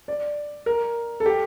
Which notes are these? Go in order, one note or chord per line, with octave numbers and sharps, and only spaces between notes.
D5
A#4
A4
G4